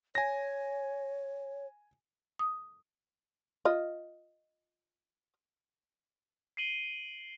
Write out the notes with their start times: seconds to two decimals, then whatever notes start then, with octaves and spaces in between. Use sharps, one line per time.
0.15 C#5 G#5 A#6
2.39 D#6
3.65 F4 D#5
6.57 C7 D7 D#7 F#7 G7